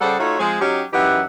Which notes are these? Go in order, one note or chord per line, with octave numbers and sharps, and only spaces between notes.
C#3 G3 G#4 A4 C5 F#5
A3 D#4 F4 F#4 A4 C#5
F3 G#3 C4 G#4
F#3 C#4 D#4 G4
F#2 E3 D#4 G4 E5 F#5